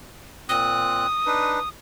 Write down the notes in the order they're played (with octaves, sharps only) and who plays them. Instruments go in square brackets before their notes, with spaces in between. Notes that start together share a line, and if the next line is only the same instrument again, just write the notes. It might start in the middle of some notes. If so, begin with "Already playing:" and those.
[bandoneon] A#2 C4 F#6 [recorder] D#6
[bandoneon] D4 D#4 B4